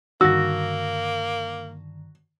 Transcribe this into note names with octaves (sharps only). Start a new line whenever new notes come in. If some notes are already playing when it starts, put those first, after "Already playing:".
G2 D3 D#3 A#3 F#4 E6 A#6